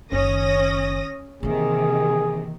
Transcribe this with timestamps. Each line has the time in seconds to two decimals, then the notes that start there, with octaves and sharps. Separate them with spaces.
0.12 F#1 D#3 C#4 D#6 A#6
1.43 C3 D#3 E3 A#3 G#4